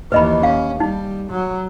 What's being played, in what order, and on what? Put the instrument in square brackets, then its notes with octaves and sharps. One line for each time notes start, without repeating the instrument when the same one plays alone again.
[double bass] D#2 E3 [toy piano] B4 D#5 B5
[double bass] C#4 [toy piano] F5
[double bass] G3 [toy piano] D#4
[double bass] F#3